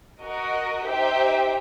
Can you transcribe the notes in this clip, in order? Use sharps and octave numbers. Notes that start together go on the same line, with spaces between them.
F#4 A#4 D#5
D#4 G4 C5 E5 G5